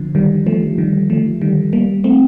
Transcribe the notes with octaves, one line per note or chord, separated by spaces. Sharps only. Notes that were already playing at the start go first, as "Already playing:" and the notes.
Already playing: D3 F3
D#3 G3
F3 A3
D#3 G3
F3 A3
D#3 G3
G3 A#3
A3 C4